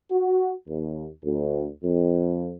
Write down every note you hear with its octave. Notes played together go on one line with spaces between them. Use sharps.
F#4
D#2
D2
F2